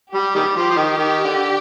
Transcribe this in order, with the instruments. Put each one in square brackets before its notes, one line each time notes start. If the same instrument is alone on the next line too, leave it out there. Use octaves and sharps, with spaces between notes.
[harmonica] G3 [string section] G4
[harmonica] D#3 G3
[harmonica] F3 [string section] G4
[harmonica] F3
D#3
D#3
D3